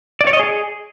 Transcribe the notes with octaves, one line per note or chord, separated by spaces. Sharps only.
D5
C#5
D#5
G#4